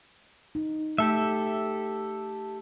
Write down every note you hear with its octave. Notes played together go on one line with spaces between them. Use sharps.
D#4
A3 G4 A4 E5